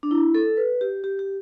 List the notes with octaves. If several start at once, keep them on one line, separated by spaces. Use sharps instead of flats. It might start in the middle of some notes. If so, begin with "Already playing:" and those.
D4
E4
A4
B4
G4
G4
G4